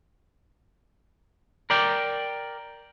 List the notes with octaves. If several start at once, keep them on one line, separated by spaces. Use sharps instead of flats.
A#4 D5 G5